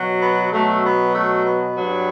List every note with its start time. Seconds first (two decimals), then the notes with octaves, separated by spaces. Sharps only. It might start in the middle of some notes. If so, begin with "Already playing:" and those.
Already playing: B2 F#3
0.22 B3
0.52 B2 F#3 A3
0.83 B3
1.14 A3
1.45 B3
1.75 G2 F#3